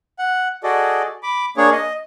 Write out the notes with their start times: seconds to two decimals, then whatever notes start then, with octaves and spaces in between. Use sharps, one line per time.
0.19 F#5
0.63 F#4 G#4 A4 D5 D#5
1.23 B5 D6
1.57 A#3 D4 G#4 C#5
1.72 D#5